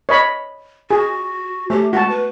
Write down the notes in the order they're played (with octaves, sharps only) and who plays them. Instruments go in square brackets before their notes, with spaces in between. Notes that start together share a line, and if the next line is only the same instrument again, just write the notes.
[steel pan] C#5 D#5 B5
[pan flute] F#4 [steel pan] G#4
[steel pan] A3 [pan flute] G4
[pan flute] G#3 [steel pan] F#4 A5
[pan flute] B4